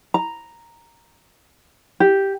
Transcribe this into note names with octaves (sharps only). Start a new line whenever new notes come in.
A#5
G4